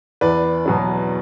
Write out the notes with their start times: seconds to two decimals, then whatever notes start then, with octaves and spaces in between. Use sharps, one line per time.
0.21 E2 B4 D5
0.66 B2 F#3 B3